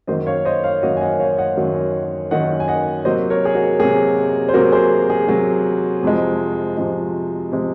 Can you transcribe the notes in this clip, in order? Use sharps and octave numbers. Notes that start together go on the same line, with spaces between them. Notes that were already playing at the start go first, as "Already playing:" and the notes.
F#2 D#3 F#3 A#3 C5 D#5
C#5 F5
C5 D#5
C#5 F5
F#2 D#3 F#3 A#3 D#5 F#5
G#5
D#5 F#5
C#5 F5
D#5 F#5
F#2 D#3 F#3 A#3
F#2 D#3 F#3 A#3 D#5 F#5
G#5
D#5 F#5
C3 F#3 A#3 C5 D#5
A#4 C#5
G#4
F#4
C3 F#3 A#3 G#4
C5
C3 F#3 A#3 F#4 A#4
G#4 C5
G#4
C3 F#3 A#3 F#4
F2 C3 F3 G#3
F2 C3 F3 G#3
C3 F3 G#3